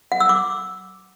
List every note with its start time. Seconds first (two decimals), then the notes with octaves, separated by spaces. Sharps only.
0.12 F#5
0.20 E6
0.29 D6